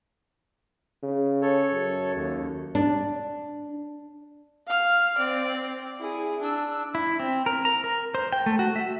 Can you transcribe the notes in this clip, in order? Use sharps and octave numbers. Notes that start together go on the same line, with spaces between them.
C#3
A4 C#5
F#2
D#2
D4
F5 F6
C4 D5
E4 G#4
D4 E6
E4
C4
A#4
A#5
A#4
C5
G5
A3
F#4
E5